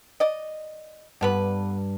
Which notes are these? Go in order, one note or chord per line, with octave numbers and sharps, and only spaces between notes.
D5 D#5
G2 D3 B3 B4